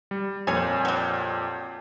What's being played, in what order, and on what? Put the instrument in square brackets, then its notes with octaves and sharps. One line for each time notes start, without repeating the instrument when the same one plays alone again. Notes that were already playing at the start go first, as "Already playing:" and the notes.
[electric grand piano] G3
[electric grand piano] F2 A#2 [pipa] C#5 G#5
[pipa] F#3 G3